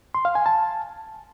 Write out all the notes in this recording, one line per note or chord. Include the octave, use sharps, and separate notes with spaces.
C6
F5
G#5
A5